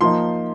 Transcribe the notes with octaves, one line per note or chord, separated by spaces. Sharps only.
F3 A#3 D#4 C6